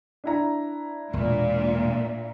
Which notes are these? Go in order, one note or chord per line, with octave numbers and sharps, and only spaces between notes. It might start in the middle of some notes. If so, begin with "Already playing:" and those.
D4 E4 A#5
E1 A#2